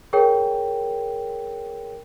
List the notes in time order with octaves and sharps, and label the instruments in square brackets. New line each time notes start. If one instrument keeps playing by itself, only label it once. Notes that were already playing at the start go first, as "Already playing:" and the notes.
[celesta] G#4 A#4 C#5 G5